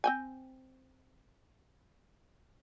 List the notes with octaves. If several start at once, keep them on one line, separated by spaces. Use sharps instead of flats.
C4 G5 G#5